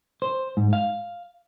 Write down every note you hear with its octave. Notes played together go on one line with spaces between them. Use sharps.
C5
G#2
F5